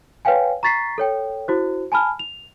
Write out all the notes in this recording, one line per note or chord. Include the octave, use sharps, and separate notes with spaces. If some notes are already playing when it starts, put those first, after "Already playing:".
B4 C#5 F5 G5 G#5
A#5 C#6 A6 B6 C7
A4 C#5 G5
E4 F#4 C5
G#5 A5 B5 F6
F7